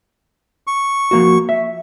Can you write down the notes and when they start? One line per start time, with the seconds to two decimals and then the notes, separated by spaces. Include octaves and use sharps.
0.67 C#6
1.11 F3 A#3 F#4
1.49 E5